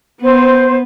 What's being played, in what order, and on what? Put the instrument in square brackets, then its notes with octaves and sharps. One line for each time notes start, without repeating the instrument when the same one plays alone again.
[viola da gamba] B3 [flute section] C5